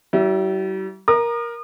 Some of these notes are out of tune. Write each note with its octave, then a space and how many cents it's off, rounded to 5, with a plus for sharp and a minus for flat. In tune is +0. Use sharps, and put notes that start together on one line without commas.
G3 -45 E4 +0
A#4 +10 D#6 -40